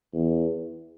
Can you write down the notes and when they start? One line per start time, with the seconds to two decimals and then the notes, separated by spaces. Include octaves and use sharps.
0.13 E2